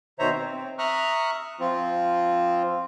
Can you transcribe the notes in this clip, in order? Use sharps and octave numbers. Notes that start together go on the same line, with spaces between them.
B2 D#3 C5 C#5 E5 A#5
C4
E5 A#5 C#6 D#6 F6 F#6
F3 C4 F4